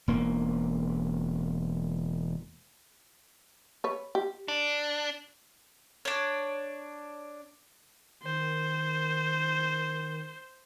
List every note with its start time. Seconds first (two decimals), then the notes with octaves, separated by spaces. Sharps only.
0.08 E1 A#3
3.84 B4 C#5
4.15 G4
4.48 D4
6.05 D4 C#5
8.23 D#3 C5